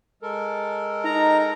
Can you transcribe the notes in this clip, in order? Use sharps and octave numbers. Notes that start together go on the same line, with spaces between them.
G#3 A4 A#4
D#4 A#5